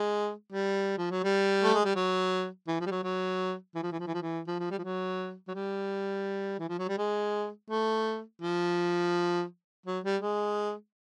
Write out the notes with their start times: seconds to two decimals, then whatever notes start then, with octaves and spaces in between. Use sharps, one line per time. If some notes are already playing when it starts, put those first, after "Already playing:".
Already playing: G#3
0.53 G3
0.98 F3
1.11 F#3
1.24 G3
1.63 A3
1.74 G#3
1.85 G3
1.96 F#3
2.68 E3
2.81 F3
2.86 G3
2.91 F#3
3.03 F#3
3.75 E3
3.83 F3
3.92 E3
4.00 F3
4.07 E3
4.15 F3
4.22 E3
4.47 F3
4.60 F3
4.71 G3
4.78 F3
4.84 F#3
5.48 F#3
5.55 G3
6.59 E3
6.69 F3
6.79 F#3
6.89 G3
6.98 G#3
7.70 A3
8.42 F3
9.86 F#3
10.04 G3
10.22 G#3